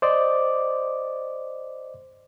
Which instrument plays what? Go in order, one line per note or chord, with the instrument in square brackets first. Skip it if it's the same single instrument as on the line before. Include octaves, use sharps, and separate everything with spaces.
[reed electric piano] C5 D5 D#5 D6